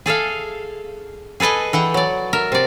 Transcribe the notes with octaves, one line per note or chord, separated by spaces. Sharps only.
G#4 A4 E5 F5
G#4 A4 B4 D#5 G#5
E3 F#5 G5
F#3 D5
A#4 E5
C3 D5